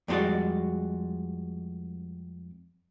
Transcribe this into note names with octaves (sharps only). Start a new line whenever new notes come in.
F2 G3 G#3 D4 F#4 D5